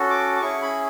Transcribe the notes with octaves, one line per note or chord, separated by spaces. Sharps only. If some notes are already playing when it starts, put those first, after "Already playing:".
Already playing: C#4 F#4 A4
D6
D6
C#4 E4 G#4 C#6
B5